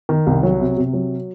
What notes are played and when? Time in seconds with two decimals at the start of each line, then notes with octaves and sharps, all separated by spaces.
0.09 D#3
0.26 C2
0.43 F#3
0.60 C3
0.77 C3
0.93 F#3